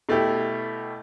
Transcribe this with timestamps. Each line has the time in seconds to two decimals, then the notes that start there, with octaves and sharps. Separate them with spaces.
0.09 B2 A3 E4 G4